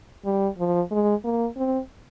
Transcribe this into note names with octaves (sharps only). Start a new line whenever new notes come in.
G3
F3
G#3
A#3
C4